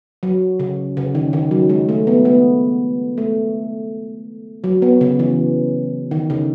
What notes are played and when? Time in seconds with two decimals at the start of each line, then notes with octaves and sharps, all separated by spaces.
0.23 F#3
0.60 C#3
0.97 C#3
1.15 D#3
1.33 D#3
1.51 F#3
1.69 G#3
1.89 A3
2.07 B3
2.25 B3
3.18 A3
4.64 F#3
4.82 B3
5.01 C#3
5.19 E3
6.11 D#3
6.30 C#3